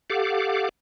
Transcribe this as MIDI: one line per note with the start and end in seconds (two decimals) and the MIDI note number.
0.10 0.69 67
0.10 0.69 69
0.10 0.69 77
0.10 0.69 78
0.10 0.69 86